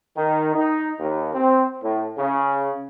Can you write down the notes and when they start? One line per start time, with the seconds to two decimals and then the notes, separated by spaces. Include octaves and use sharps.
0.17 D#3
0.55 D#4
1.00 D#2
1.34 C4
1.82 A2
2.18 C#3